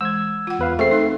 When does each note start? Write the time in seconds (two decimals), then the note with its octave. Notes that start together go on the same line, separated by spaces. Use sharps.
0.01 E3 G#3 E6 G#6
0.47 F4 F#5
0.59 E2 B4 F5
0.79 A3 C4 G#4 C5 F5 C7
0.91 D#4 A4